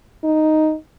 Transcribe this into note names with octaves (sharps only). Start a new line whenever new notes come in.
D#4